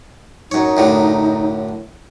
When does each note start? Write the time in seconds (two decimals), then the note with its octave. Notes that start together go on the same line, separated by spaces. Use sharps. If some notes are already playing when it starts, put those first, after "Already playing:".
0.51 F#2 D#4 C#5
0.77 F#2 A2 D3